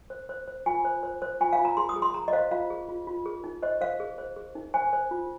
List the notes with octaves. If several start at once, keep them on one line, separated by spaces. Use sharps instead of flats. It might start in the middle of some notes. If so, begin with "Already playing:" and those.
C5
C5
C5
F4 G#5
C5
C5
C5
F4 G#5
F5
F4
A#5
G#4 C6
D#6
G#4
C6
G#4 A#5
D#5
C5 F5
F4 F5
G#4
F4
F4
G#4
D#4
C5 D#5
C5 F5
G#4
C5
G#4
D#4
C5 G#5
C5
F4